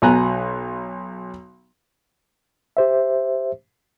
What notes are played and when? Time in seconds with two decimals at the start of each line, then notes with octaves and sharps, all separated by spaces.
0.02 B1 B2 G#5 A#5 F#6
2.77 G4 C5 E5